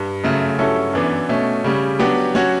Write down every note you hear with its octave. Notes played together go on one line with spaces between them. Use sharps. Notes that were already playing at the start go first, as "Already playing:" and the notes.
Already playing: G2
F#2 C#3 F#3 A3
G2 F#3 C#4 E4 A4
F#2 E3 B3 D4
B2 A3 C#4
C#3 G3 C#4
F#3 B3 D4 G4
F#3 C#4 F#4 C#5